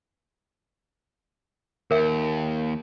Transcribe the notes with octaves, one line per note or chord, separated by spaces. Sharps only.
D#2 A#4 E5